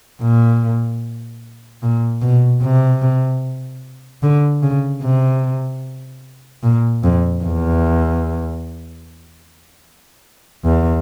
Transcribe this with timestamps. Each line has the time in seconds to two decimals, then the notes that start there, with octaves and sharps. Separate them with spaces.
0.21 A#2
1.83 A#2
2.22 B2
2.62 C3
4.23 D3
4.62 C#3
5.02 C3
6.63 A#2
7.04 F2
7.43 E2
10.65 E2